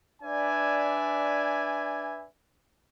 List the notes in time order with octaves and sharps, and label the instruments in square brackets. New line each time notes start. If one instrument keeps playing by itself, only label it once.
[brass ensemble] D4 B4 D5 E5 G#5